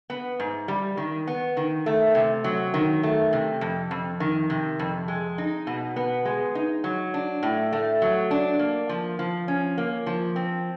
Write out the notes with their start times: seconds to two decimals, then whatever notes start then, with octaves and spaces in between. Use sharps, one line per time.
0.10 B3
0.40 G#2
0.68 G3
0.97 D#3
1.27 B3
1.57 D#3
1.86 A3
2.15 C3
2.44 F#3
2.74 D#3
3.03 A3
3.33 C3
3.61 F2
3.91 F2
4.20 D#3
4.50 C3
4.79 F2
5.08 G#3
5.38 D#4
5.67 B2
5.96 B3
6.25 G#3
6.55 D#4
6.84 F#3
7.14 D4
7.43 A2
7.72 A3
8.02 F#3
8.31 D4
8.59 A#3
8.89 F3
9.19 F3
9.48 C#4
9.78 A#3
10.06 F3
10.36 C4